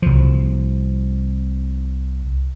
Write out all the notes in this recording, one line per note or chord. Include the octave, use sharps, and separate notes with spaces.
C2 F3